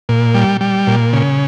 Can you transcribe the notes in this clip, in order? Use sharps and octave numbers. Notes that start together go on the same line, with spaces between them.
A#2
G3
G3
A#2
C#3